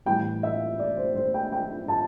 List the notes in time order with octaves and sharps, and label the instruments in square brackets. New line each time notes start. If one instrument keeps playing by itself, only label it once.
[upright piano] A2 E3 G3 G5
E5
D5
C5
C5
G5
G5
A5